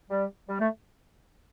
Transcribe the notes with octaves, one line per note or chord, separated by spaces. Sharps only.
G3
G3
A3